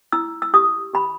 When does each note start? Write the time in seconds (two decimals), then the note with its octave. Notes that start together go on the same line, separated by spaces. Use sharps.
0.12 E4 E6
0.42 E6
0.54 G4 D#6
0.94 G4 B5